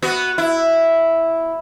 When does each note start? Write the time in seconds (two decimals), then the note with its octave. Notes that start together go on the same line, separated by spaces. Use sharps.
0.02 B3 F#4
0.38 E4